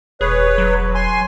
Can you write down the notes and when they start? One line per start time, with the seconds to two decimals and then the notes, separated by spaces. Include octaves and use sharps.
0.21 E1 G#4 B4 C#5
0.58 F#3
0.95 G#5 C6